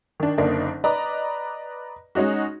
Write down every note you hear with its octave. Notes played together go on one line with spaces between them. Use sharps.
D#3 D4
F#1 D3 A#3 D4 D#4
B4 D5 D#5 A#5
G#3 C#4 D#4 F#4